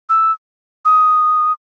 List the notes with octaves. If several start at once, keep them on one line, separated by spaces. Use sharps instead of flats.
E6
D#6